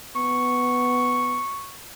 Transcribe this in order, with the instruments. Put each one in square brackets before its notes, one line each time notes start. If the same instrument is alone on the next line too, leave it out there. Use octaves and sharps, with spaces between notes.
[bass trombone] B3 [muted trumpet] C#6